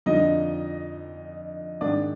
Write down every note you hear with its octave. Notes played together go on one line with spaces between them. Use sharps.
F2 D3 F3 D#4 D#5
G#2 D#3 D4 D5